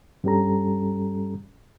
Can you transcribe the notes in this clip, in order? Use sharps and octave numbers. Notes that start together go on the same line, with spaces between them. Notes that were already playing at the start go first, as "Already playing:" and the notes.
G2 G3 C#4 G4 A4 A#5